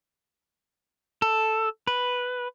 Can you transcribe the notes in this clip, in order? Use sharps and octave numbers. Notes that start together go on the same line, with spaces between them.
A4
B4